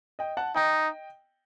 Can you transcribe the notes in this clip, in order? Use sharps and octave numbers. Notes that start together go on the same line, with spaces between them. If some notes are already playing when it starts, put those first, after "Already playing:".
D#5 G5
F#5 A5
D#4 D#5 G5